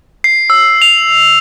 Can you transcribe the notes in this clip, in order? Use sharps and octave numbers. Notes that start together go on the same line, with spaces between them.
C7
E6
F7